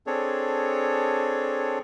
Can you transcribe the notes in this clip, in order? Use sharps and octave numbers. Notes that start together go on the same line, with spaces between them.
C4 D4 G#4 A4 C#5